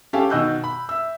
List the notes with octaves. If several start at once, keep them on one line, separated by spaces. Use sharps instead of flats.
C#4 G4 A4 F5 G#5 A5
B2 D#3 D#5 E6 F#6 G6
B5
E5 E6